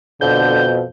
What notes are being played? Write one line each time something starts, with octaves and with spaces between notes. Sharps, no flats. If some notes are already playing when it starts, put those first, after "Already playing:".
F2 B2 D3 G6